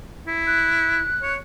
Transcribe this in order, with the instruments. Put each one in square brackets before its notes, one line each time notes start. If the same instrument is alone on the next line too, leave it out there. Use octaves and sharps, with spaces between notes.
[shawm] E4
[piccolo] F#6
[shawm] C#5